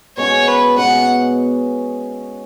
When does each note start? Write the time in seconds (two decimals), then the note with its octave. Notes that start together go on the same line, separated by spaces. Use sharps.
0.17 B2 G#3 C#4 F#4 C#5
0.48 B4
0.77 B2 G#3 C#4 F#4 F#5